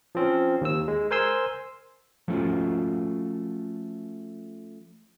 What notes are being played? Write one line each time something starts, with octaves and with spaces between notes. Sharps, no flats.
F3 C4 C#4
D#2 E6
G#3
A#4 C5 G#5 C6 E6
F3 A3 C#4 F4 F#4